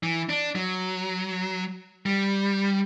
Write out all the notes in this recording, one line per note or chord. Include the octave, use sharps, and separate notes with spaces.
E3
D4
F#3
G3